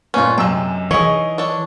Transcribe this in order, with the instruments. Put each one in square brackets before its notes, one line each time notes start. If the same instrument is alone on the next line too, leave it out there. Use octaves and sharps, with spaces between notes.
[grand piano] G1 A#2 B4 [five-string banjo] C#4 F4
[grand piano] F#2 C3 E6 [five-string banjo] G#3 G5
[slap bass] E3 [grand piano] D#4 D#5 [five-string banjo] G#4 C#5
[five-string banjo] D4 A4 C#5